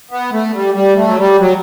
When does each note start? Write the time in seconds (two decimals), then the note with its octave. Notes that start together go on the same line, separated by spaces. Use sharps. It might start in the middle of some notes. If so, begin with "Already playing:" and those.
0.11 B3
0.32 A3
0.54 G3
0.75 G3
0.96 A3
1.07 F#3
1.17 G3
1.39 F#3